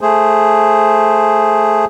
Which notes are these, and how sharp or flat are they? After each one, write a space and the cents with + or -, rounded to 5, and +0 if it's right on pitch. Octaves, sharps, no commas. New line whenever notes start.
A3 +0 G#4 +0 C5 +0